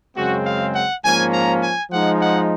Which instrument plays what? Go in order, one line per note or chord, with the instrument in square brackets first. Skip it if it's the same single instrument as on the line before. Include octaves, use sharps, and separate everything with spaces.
[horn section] F#2 C#3 G#3 C4 F#4
F5
F#5
G#2 F3 A#3 C#4 G#5
A#5
G#5
F3 G#3 D#4 F#5
F#5